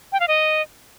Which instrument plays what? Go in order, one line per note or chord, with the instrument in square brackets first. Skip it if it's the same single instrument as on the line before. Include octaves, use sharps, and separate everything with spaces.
[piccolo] G5
F5
D#5